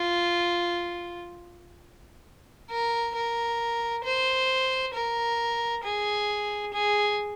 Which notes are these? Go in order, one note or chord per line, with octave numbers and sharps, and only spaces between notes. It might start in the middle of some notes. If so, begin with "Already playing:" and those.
Already playing: F4
A#4
A#4
C5
A#4
G#4
G#4